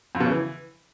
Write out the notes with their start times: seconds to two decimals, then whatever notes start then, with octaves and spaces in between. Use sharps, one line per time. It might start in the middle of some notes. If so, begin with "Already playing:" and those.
0.15 F2
0.20 B2
0.26 C#3
0.31 E3